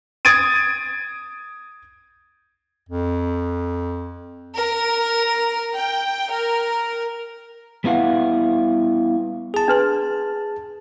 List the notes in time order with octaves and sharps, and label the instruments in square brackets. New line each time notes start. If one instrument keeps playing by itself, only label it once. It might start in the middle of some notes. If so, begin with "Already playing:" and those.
[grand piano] D#6 G#6 A6 D7 D#7
[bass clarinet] F2
[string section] A#4
G5
A#4
[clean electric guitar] G3 B3 E4 F5 F#5
[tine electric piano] G#4 A5
[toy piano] D4 B4 C6